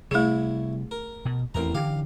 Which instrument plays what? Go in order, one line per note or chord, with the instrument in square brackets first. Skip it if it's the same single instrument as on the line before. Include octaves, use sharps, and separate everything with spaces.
[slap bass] C3 G3 [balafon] A3 G#4 [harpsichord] E4 C#5
[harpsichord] A#4
[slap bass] B2
[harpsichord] A1 A#4 A#5 [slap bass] E2 C4
[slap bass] D3 E3 [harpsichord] G4 F5